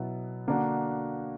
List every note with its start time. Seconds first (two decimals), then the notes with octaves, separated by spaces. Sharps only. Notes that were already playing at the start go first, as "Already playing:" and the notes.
Already playing: B2 F#3 B3 E4
0.47 D3 A#3 D4 F#4